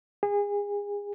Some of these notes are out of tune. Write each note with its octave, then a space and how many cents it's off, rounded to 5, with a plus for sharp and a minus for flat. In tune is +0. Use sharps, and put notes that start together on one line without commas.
G#4 -30